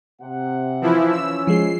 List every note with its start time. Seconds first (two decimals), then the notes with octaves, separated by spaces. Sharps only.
0.21 C3 F#5
0.81 E3 F3 E4
1.11 C#4 E6
1.47 F3 G#3 C7